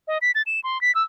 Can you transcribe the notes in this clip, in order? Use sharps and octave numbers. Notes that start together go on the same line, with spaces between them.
D#5
B6
A6
E7
C6
B6
E6